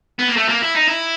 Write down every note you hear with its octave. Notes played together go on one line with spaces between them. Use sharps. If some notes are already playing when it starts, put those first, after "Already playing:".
B3
A#3
A3
A#3
E4
D#4
E4